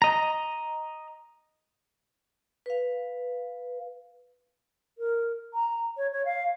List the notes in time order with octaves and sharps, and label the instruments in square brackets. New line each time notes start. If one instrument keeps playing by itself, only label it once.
[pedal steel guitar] D#5 A#5
[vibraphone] B4 F5
[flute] A#4
A#5
C#5
C#5
F5